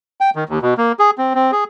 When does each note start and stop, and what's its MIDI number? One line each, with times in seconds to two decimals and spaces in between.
0.21 0.30 79
0.35 0.44 51
0.49 0.59 39
0.62 0.74 47
0.77 0.92 58
0.99 1.11 68
1.18 1.33 60
1.35 1.51 60
1.52 1.64 68